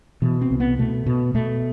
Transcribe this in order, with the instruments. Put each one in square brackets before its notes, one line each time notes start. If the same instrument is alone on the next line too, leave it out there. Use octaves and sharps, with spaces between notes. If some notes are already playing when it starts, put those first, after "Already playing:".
[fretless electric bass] B2 E3
C4
C2
B3
B2 A3
B2
B2 A3